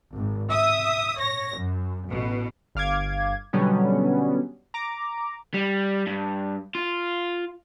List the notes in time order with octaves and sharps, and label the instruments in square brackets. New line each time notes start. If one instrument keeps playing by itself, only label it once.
[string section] G#1
E5 D#6
C#5 A#6
F#2
A1 B2
[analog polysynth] G1 F5 D6 G#6
B2 D3 F#3 G3 B3 C#4
A#5 D6
[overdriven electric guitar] G3
G2
F4